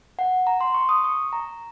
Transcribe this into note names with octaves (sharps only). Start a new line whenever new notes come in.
F#5
A#5
C6
C#6
D#6
C#6
A#5